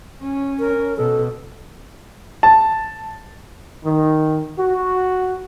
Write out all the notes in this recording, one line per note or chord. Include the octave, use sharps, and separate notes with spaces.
C#4
A#4
B2 A4
A5
D#3
F#4